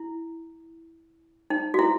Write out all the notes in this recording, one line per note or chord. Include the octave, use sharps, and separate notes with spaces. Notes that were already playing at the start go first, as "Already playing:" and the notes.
Already playing: E4
D#4
F#4
E4